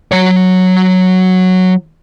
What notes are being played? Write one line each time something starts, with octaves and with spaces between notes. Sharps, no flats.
F#3 C#5